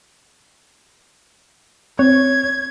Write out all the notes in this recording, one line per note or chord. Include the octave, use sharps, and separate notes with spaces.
C4 C#5 G#6